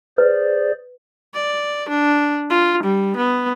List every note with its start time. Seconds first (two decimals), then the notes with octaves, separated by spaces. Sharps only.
0.18 G#4 B4 C5 D5
1.35 D5
1.89 D4
2.50 F4
2.83 G3
3.17 B3